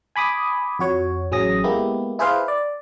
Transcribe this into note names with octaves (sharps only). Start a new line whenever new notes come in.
G#5 B5 D6 D#6
F2 F#4 C#5
A1 F#3 C#4 G#4 D#6 A#6
G#3 A#3 B3 E4 G4
E4 G#4 B4 C5 F5
D5